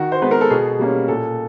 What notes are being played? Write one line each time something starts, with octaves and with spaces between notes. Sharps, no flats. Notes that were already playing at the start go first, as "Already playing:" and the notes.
Already playing: D#3 F#4
C5
G#3 B3 B4
A#4
A4
B2 G#4
G3 A#3 C#4
A#2 A4